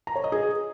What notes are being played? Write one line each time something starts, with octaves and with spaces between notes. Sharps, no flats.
A#5
C#5
D#5
G#4